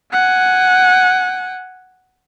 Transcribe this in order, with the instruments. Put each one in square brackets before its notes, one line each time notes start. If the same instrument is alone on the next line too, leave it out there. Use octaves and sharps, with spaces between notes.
[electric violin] F#5 G#5